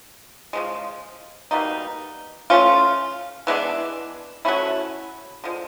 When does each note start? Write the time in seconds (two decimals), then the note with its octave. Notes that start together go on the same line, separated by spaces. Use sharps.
0.53 C#3 F3 G#3
1.51 B2 G3 A#3 D#4
2.50 A3 C#4 F4
3.47 E3 G#3 B3 D4
4.45 F#3 A3 C#4 E4
5.44 D3 F3 G#3